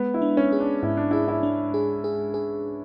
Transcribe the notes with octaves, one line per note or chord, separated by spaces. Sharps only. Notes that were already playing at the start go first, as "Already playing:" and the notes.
Already playing: G#3 B3
E4
D4
C#4
G#4
D4
G#2 E4
D4
E4 G#4
E4
D4
G#4
G#4
G#4